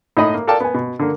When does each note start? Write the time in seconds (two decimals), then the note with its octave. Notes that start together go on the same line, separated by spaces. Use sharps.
0.17 A2 D#4 D#5 B5
0.34 A#3
0.47 A4 A#4 D5 F5 G5 A5
0.60 B3 G#5
0.74 B2
0.99 D3 A#3